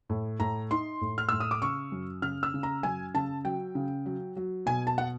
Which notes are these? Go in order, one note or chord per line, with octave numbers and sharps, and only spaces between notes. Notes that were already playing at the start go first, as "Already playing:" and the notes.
A2
A2 A#5
D#4 C6
A2
F6
A2 E6
D#6
D6
C#3 C#6
F#2
C#3 F6
E6
C#3
A#5
F#2 G#5
C#3 A5
F#3 G5
C#3
F#3
F#3
B2 G#5
A5
F#5